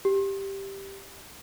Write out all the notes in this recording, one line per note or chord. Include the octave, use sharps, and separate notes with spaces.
G4